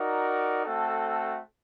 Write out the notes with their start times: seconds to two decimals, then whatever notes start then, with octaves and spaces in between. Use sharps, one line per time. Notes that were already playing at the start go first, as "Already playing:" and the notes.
Already playing: D#4 F#4 A#4 D5
0.63 A3 C4 F#4 A4